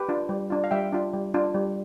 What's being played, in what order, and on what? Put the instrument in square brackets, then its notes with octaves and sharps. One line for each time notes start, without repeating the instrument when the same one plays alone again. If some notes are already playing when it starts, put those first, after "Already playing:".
Already playing: [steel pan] G4 B4
D4 F4
G3
D4 F4
F5
G3 E5 G5
D4 F4
G3
D4 F4
G3